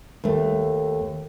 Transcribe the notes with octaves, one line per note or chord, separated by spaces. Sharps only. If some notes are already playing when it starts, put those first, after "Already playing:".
D#2 A3